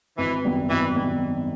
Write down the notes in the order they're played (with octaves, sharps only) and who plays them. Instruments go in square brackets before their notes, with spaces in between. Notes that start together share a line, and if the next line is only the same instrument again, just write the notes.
[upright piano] G#1 [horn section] E3
[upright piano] F#2 D#3 G3 B3
[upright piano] G#1 [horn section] E3
[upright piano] D#3 G3 B3